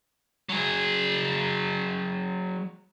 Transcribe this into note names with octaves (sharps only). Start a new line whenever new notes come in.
F#3 G#4